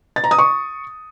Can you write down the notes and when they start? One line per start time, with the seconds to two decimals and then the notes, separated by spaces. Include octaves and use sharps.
0.16 A6
0.24 A#5
0.31 D#6
0.38 C#6